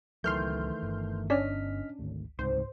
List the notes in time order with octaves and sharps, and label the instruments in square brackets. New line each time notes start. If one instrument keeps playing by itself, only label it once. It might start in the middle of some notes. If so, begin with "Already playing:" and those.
[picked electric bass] C#2 F#3 [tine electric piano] D#3 E3 A3 [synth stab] C6 F6 G6
[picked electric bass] G1
[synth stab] C#4 D4 [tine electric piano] D#5 F6 B6
[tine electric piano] G#1 D2
[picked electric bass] C#2 C3 [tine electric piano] G#2 [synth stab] C5